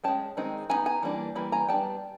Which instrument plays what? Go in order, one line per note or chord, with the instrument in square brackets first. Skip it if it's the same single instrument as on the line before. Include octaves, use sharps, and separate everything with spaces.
[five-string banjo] G#3 C#4 G5 A5
D#3 G#3 C4 D#4
F#3 B3 D#4 G#5 A#5
G#5 A#5
E3 G3 A#3 D4
E3 G3 A#3 B5
G#5 A#5
G3 B3 D4 G5 A5